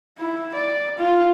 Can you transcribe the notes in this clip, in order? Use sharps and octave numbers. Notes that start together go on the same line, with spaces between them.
E4
D5
F4